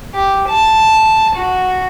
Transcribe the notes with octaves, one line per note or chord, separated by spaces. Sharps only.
G4
A5
F#4